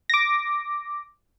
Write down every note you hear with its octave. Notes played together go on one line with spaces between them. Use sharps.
D6 A#6